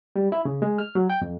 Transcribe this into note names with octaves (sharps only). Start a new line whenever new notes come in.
G3
E4
C#3
G#3
F6
F#3
G5
F2